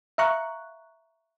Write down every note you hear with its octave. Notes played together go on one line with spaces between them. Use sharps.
E5 F5 A#5 C#6 F#6